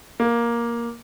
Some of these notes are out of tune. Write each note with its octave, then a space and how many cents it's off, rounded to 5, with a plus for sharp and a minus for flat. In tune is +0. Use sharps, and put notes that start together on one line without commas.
A#3 +10